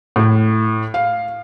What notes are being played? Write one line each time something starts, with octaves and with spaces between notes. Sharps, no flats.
A2
F5